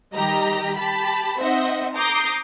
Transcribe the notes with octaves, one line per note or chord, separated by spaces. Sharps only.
D#3 G3 G4 D#5 A#5
G4 A5 B5
C4 D#4 C5 D#5 E5 F#5
A#5 D6 D#6 G6 C7